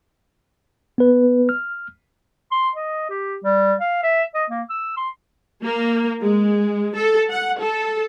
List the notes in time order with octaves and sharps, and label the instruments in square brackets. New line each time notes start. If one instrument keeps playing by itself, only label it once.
[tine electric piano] B3 B4
F6
[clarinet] C6
D#5
G4
G3
F5
E5
D#5
A#3
E6
C6
[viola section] A#3
G#3
A4
F#5
A4